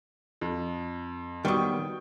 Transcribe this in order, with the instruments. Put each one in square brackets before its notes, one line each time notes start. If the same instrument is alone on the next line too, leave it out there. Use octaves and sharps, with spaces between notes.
[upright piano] F2
[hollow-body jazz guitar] D#3 F#3 [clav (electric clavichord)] G3 B3 [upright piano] G5 C#6 D#6